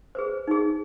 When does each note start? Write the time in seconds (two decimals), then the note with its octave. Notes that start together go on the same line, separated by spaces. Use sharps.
0.15 G#4 B4 C5
0.47 D#4 G#4